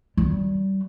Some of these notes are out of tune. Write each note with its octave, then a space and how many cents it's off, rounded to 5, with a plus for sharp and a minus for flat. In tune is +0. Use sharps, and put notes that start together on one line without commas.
G3 -25